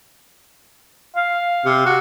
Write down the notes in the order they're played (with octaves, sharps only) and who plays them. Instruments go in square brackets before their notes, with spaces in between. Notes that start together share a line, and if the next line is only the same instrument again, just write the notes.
[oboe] F5
[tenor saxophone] C3
F#4